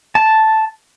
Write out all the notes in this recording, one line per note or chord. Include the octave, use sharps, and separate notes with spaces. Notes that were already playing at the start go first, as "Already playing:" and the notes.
A5